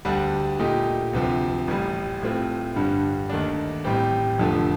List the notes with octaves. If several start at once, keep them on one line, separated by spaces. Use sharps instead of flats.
D2 D3 G3 D4
A#2 A3 D#4 G4
D2 C3 F3 C4
A1 A2 G3
A2 A3 C4 F4
G2 D3 G3
D#2 D#3 A3 D4
A1 A2 G3 C4 G4
F1 F2 D3 F3 A3